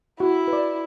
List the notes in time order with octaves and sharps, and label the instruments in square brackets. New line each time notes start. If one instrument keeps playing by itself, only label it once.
[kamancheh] E4 [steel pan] F#4
[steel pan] B4
D5